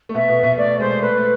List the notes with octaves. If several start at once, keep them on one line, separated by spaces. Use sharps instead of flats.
A3
B2 B3 E5
B2 B3
B2 B3
A3 D5
G#3 C5
A3 B4
A3